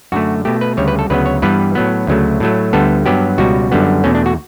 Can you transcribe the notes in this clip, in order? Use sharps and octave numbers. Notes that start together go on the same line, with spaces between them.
F#2 D3 A3 F#4
B2 A3 G4
B4
D2 C#3 G3 C#5
B4
A4
D2 C#3 F#3 B3 B4
C#5
G2 E3 G3 B3 B4
A2 F#3 B3
D2 C#3 F#3 A3
A2 F#3 A3
D2 D3 G3 B3 A4
G2 F#3 B3 G4
C#2 B2 G3 F#4
F#2 D3 G3 B3
E2 B2 A3 C#4
D4
F#4